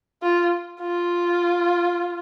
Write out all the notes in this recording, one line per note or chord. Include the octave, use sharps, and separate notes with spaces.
F4
F4